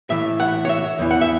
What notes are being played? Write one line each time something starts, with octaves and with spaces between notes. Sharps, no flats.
A2 E3 E5
F#5
C#5
E5
E2 E3
F#5
E5